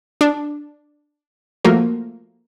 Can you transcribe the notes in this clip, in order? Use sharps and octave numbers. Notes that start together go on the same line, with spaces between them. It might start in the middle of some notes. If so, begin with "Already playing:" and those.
D4
F3 A3 A#3 F4 F#4 A#4